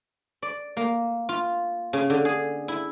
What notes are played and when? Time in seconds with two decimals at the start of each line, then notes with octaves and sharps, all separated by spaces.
0.42 D5
0.77 A#3
1.29 F4
1.93 C#3
2.10 D3
2.25 G#4
2.68 E4